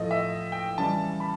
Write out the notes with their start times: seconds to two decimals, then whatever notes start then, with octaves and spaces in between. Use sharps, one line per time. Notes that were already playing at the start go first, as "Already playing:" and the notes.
Already playing: A2 F3 A3 D#5
0.11 E5
0.52 G5
0.78 C#3 E3 G3 A5
1.20 B5